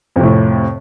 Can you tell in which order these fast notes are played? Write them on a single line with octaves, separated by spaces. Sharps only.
F2 C3 A2